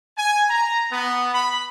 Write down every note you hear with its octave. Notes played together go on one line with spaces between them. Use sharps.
G#5
A#5
B3
B5